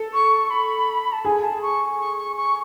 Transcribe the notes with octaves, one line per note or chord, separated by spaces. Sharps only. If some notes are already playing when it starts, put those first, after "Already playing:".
Already playing: A4
C#6
B5
A5
G#4 G#5
A5
C#6
C#6
C#6
C#6